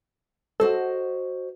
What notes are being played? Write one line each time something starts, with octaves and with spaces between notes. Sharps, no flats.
F#4 A4 C5 D#5